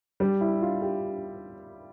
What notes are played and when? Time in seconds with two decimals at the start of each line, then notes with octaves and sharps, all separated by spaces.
0.20 G3
0.41 E4
0.62 F4
0.82 G4